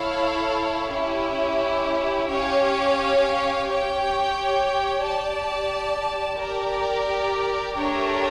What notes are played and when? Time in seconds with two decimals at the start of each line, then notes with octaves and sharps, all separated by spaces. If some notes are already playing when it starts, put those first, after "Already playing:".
Already playing: E4 A4 C#5 F5
0.93 C#4 E4 G4
2.29 C#4 G4 C#5 F5
3.66 G4 C#5 G5
5.02 G4 D5 A5
6.39 G4 A#4 D5
7.75 A3 D4 G4 A#4 C#5